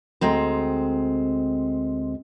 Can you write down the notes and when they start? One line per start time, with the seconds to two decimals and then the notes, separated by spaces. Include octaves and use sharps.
0.21 D2 G#3 C4 A#5